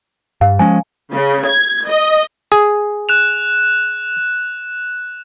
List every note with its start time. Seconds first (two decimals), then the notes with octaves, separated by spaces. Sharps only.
0.41 G2 F5
0.59 F3 G#3 C#4 G#5
1.12 C#3
1.46 G#6
1.86 D#5
2.52 G#4
3.09 F#6 E7 F7